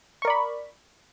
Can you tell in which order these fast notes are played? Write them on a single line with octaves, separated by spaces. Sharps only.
C#6 A#4 D5 B5